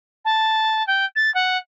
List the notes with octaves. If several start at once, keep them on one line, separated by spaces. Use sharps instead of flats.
A5
G5
A6
F#5